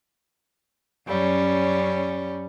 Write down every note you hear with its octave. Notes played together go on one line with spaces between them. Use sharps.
F#2 G3 C#4